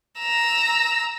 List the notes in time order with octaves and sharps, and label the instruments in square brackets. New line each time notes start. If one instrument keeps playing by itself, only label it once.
[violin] A#5 E6